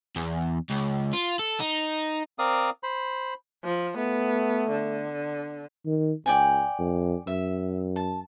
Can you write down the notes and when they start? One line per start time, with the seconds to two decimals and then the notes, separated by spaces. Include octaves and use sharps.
0.16 E2
0.70 C#2
1.13 F4
1.39 A4
1.60 D#4
2.39 C4 A#4 D5 F5 D#6
2.83 C5 B5
3.64 F3
3.98 A3 B3
4.71 D3
5.86 D#3
6.26 C#2 D5 G5 G#5
6.79 F2
7.27 F#2 E5
7.96 A5